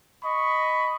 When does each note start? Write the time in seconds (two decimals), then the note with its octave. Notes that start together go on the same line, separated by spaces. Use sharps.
0.23 D#5 B5 C#6